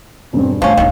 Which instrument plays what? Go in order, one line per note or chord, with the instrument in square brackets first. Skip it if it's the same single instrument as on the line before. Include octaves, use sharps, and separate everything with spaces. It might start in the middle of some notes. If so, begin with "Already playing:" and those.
[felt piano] E1 G2 [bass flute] C4
[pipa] F3 C#4 [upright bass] A3 [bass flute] F5
[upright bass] D1 D4 [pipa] D#3 C#4